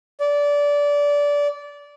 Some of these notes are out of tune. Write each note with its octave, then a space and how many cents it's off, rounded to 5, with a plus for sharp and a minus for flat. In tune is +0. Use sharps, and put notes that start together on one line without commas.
D5 -20